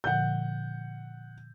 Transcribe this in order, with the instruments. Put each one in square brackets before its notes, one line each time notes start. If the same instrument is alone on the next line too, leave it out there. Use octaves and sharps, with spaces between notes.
[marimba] A#2 D3 F3 [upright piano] F#5 G6